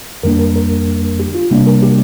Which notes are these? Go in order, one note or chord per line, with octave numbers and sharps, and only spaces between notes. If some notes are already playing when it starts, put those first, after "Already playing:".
F2 D3 G3 A#3 D4 A#4
A#4
A#4
G4
F4
C3 G3 A#3 D4
A#4
G4